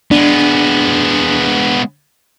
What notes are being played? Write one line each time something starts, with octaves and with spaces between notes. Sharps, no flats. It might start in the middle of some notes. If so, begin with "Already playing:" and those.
G#3 B3 D4